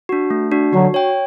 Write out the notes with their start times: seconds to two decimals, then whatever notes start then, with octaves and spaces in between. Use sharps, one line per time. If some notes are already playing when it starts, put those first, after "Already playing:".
0.09 D4 F#4
0.30 A3
0.52 D4 F#4
0.73 D3 F#3 F#4
0.94 C#5 G5